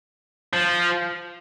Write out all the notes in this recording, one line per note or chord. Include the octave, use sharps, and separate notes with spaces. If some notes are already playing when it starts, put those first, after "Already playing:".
F3